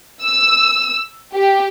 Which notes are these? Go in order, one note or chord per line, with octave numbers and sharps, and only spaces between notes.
E6
G4